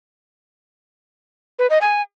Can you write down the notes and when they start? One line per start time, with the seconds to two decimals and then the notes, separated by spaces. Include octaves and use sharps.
1.59 B4
1.70 D#5
1.81 G#5